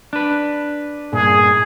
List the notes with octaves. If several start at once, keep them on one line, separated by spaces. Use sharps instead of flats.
D4 B4
G2 A#2 G#4